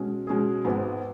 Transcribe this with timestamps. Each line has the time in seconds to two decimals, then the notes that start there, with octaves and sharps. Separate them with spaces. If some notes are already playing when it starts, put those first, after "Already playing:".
Already playing: B2 G#3 C#4
0.27 B2 G#3 C#4 G#4
0.65 G#1 G#2 G#3 B3